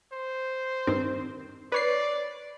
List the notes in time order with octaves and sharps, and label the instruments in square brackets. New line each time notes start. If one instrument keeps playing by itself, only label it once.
[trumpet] C5
[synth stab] G2 D#3 C4
[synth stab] B4 C#5 C7 [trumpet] D5